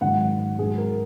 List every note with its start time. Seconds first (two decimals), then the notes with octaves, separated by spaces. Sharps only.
0.01 G#2 D#3 F#3 F#5
0.58 G#2 F#3 G#4
0.78 A#4